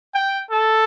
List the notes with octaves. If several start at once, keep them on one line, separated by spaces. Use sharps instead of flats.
G5
A4